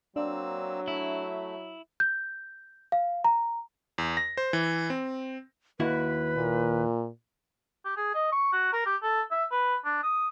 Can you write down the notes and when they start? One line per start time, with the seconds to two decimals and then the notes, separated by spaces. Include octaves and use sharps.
0.16 F#3 A#3 C4 D4 E6
0.88 A3 E4
2.00 G6
2.92 F5
3.24 A#5
3.98 E2
4.17 A#6
4.37 C5
4.53 E3
4.90 C4
5.80 D#2 E4 F#4 B4
6.36 A#2
7.85 G4
7.97 G#4
8.15 D#5
8.32 C#6
8.53 F#4
8.73 A#4
8.86 G4
9.03 A4
9.31 E5
9.51 B4
9.85 D4
10.03 D#6